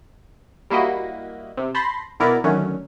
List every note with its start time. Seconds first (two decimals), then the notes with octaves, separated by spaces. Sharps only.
0.70 G3 A#3 E4 F#4 D#5
1.57 C3
1.75 A5 B5 C6 G6 A6 A#6
2.20 B2 B3 E4 A#4 D5
2.44 D3 D#3 F#3 A3 C#4